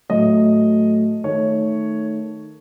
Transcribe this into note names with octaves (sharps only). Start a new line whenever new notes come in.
A2 F#3 A3 D#5
D#3 A3 C#5